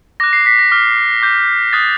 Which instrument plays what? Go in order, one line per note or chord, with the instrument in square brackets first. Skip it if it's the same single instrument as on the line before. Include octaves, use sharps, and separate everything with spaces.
[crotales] D6 F#6 A#6
C7
B6
A#6
D6 F6
D6 G6
D#6 F#6 A6